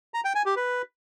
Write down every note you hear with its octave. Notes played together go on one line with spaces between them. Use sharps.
A#5
G5
G#5
G4
B4